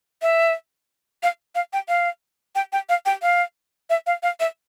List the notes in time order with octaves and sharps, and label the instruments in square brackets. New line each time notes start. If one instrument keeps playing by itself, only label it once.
[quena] E5
F5
F5
G5
F5
G5
G5
F5
G5
F5
E5
F5
F5
E5